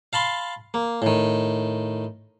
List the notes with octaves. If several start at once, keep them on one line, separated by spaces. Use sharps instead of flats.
F5 A5 B5 C6
A#3
A2 D#3